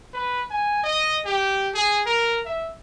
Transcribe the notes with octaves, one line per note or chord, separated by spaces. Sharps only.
B4
G#5
D#5
G4
G#4
A#4
E5